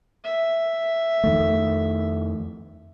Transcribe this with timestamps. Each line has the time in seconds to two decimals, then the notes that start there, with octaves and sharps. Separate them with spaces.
0.24 E5
1.24 F2 D#3 A3